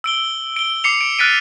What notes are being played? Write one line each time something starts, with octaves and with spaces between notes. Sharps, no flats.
E6 D7 G7
D7 G7
D6 C7 C#7 F7
D7
F6 F#6 A6 B6 D7 D#7